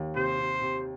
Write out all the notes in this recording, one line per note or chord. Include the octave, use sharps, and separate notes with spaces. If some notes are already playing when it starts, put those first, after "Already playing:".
Already playing: D#2
C3 C5
C3
C3